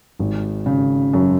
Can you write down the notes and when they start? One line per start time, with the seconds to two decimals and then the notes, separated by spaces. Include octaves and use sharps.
0.19 G#1
0.66 C#3
1.13 F#2